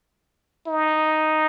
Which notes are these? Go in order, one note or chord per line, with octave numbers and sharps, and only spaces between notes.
D#4